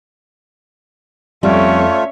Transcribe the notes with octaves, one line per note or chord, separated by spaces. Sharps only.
F2 G3 A3 C#4 F4 C#5 E5